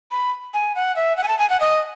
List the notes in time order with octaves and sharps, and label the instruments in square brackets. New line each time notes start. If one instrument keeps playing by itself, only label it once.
[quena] B5
G#5
F#5
E5
F#5
G#5
A5
G#5
F#5
D#5